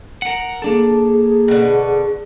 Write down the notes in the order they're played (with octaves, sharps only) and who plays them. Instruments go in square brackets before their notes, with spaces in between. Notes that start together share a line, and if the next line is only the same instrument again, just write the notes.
[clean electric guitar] A#4 F#5
[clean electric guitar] A#3 D4 A4 [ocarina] G#4
[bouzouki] B2 D3